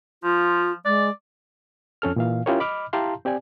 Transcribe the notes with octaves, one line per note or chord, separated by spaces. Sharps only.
F3 F4
G#3 D5
F2 C#4 A4 F6
A#2 E3 F5
C#4 E4 F4 G4 A#4 C#5
D#5 B5 D6 F6
E4 G4 F5 A5 A#5 C6
C4 G4 D5 G#5